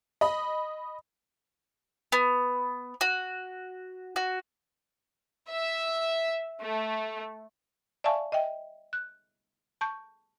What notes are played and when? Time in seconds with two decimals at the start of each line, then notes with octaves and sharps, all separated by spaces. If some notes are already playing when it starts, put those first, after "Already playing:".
0.21 D#5 B5
2.12 B3
3.01 F#4
4.16 F#4
5.50 E5
6.61 A3
8.04 D5 E5 F5 G#5 A5 C#6
8.32 D#5 E5 G5
8.93 F#6
9.81 A5 C#6 G6